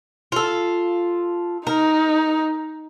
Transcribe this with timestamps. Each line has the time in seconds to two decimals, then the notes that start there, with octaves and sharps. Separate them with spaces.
0.32 F4 A4
1.67 D#4 A#4